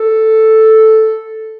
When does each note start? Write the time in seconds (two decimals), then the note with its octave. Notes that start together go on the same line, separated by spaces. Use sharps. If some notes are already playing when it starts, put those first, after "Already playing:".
Already playing: A4